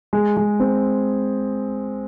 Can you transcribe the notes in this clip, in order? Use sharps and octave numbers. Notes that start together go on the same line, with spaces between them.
G#3
G#3
C4